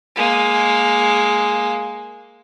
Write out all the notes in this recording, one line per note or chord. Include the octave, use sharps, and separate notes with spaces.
G#3 A#3